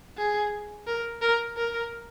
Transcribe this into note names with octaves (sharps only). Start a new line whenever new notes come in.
G#4
A#4
A#4
A#4